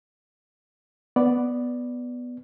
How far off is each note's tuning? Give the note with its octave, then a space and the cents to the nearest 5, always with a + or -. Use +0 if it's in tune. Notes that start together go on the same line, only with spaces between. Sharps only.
B3 +0 D5 +0